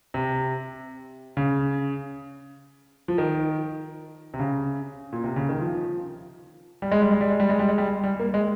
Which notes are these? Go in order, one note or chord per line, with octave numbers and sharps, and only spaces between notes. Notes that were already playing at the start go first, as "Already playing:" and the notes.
C3
C#3
F3
D#3
C3
C#3
A#2
C3
C#3
D#3
F3
G3
G#3
G3
G#3
G3
G#3
G3
G#3
G3
G#3
G3
G3
A#3
G#3